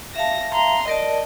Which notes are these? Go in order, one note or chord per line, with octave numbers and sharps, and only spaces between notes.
E5 F5 A5 A#6
A#5 C6
A#4 D5 D#5 A5